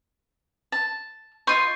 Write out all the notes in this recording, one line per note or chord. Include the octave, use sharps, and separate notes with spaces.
A5
F4 D#5 C6 C#6 G6 C7